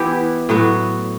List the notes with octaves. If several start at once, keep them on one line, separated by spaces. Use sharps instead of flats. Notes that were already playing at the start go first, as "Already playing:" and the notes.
Already playing: E3 B3 E4 G4
A2 F#3 B3 F#4